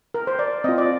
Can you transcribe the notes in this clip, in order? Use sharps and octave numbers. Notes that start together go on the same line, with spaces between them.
A#4
C5
D5
C4 F4 D#5
D5